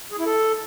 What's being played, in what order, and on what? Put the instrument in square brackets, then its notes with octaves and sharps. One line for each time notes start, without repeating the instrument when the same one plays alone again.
[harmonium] G#4
E4
A4